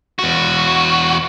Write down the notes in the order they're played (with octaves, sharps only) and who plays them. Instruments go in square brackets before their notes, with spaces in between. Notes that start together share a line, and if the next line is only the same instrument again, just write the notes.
[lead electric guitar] E2 F#4